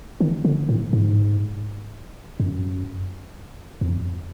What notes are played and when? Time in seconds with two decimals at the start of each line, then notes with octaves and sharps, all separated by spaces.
0.20 D#3
0.45 D3
0.69 A2
0.93 G#2
2.40 F#2
3.81 E2
3.86 F2